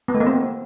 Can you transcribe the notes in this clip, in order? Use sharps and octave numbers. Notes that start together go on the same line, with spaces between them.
B3
A3
A#3
C4